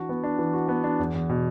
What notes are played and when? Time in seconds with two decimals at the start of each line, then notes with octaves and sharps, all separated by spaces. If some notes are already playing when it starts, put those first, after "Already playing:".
Already playing: E3 D4 F#4
0.09 B3
0.23 D4
0.39 E3
0.53 F#4
0.68 B3
0.84 D4
0.99 E2
1.14 E2
1.29 B2